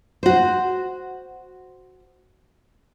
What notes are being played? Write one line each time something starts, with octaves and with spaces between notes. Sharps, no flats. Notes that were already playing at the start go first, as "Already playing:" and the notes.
F#4 C5